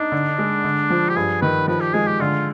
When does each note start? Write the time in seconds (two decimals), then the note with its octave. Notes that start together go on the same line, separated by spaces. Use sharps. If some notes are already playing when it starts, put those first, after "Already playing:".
Already playing: D4 D#4
0.12 D3
0.38 G#3
0.64 D3
0.90 F3
1.09 G4
1.16 G2 G#4
1.42 D#3 B4
1.68 F3 B4
1.81 G4
1.93 G#3 G#4
2.07 G4
2.20 D3 F4